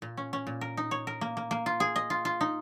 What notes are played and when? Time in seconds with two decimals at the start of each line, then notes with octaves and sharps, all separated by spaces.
0.02 A#2
0.17 C#4
0.33 C#4
0.47 A#2
0.61 A#4
0.77 D#4
0.91 C#5
1.07 A#4
1.21 A#3
1.37 A#3
1.51 A#3
1.66 F4
1.80 G#4
1.96 D#5
2.10 F4
2.25 F4
2.41 D#4